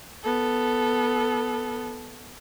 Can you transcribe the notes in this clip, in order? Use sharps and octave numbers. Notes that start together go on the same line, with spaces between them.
B3 A4